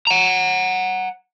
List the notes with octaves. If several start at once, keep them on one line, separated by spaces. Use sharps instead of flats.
F#5 A#5